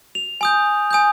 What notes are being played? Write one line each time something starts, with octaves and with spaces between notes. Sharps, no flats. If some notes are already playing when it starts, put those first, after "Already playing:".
F7
G#5 D#6 G6
G#5 D#6 G6